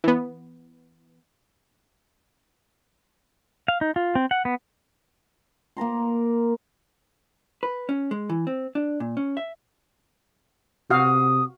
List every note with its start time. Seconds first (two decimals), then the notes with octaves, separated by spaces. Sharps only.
0.04 E3 B3
3.68 F5
3.81 D#4
3.96 F4
4.15 C4
4.31 F#5
4.45 B3
5.77 A#3 A#4 A#5 C6
7.63 B4
7.89 C#4
8.11 G#3
8.30 E3
8.47 C4
8.75 D4
9.00 A#2
9.17 C#4
9.37 E5
10.90 C3 F#4 F5 D#6